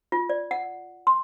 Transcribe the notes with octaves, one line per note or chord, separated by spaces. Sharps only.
F4
D5
F#5
C6